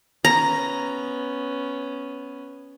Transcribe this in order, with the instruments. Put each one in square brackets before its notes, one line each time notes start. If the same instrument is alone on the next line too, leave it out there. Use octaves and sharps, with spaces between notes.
[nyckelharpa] B3 C#4 [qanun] A#5